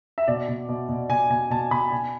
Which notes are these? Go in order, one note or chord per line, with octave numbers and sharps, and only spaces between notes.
E5
B2 D5
B2
B2
B2
B2 G#5
B2 G#5
B2 A5
B2 B5
B2 G#5